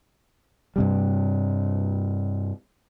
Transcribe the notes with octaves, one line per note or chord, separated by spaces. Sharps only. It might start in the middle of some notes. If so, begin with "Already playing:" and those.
G2 C3 G3